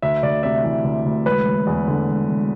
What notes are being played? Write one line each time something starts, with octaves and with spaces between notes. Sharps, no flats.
D2 E5
D2 D5
C3 E5
E3
D2
D2
E1 B4
E1
E2
D3
E1
E1